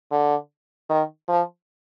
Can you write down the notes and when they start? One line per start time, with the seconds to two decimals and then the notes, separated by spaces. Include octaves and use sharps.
0.11 D3
0.90 D#3
1.29 F3